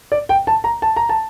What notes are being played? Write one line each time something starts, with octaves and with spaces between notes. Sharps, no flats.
D5
G5
A5
A#5
A5
A#5
A5